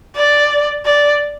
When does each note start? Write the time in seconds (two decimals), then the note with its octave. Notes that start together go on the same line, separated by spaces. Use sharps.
0.16 D5
0.85 D5